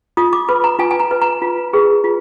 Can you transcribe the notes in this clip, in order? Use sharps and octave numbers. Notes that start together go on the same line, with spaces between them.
F4 D#6
D6
B4 B5
A#5
F4 G#5
G#5
A#5
B4
A#5
F4
G#4 B4
F4